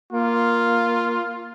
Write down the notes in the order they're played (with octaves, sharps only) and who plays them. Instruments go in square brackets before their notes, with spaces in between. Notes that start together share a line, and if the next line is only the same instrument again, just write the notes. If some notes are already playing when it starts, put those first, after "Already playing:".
[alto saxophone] A#3 [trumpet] F4